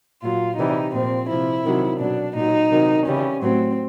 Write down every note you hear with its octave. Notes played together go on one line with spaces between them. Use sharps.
A#2 F#3 F4
C3 E3 G3 D#4
A#2 F3 C4
C3 F3 E4
C3 D#3 F#3
B2 F#3 D4
A#2 F#3 D#4
C3 D#3 F#3
C#3 E3 G3 C#4
A2 F#3 C4